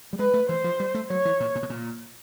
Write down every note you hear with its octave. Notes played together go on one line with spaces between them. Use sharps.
G3
G#3 B4
A3
E3 C5
F3
G3
A3
F#3 C#5
E3
A#2
A#2
B2
A#2